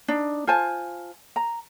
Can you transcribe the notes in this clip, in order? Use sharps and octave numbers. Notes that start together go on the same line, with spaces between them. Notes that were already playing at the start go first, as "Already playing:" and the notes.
D4 D#4
F4 C5 G#5 A5
A#5